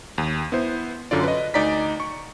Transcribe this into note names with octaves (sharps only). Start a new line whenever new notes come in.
D#2
B3 E4 C5
F#2 D3 C#4 F4 D5
B4 D#5
D2 D#4 D5 A#5 B6
C#6